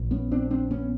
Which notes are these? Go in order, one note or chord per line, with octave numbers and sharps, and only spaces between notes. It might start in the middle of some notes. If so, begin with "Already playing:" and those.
Already playing: A#1
B3 C#4
C4 D4
C4 D4
B3 C#4